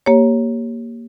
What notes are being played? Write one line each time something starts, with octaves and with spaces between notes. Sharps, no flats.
A#3 G4 C#5